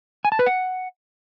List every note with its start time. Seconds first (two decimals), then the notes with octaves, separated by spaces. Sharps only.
0.25 G#5
0.32 A5
0.39 B4
0.46 F#5